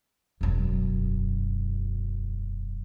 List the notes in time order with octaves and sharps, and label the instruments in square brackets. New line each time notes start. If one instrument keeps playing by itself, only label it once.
[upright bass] E1 F#2